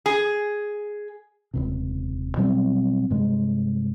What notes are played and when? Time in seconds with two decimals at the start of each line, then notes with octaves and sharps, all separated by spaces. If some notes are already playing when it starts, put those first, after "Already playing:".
0.06 G#4
1.54 D#1 C#2 C3
2.37 B2 F#3 G3 C4
3.10 G2 C3 G#3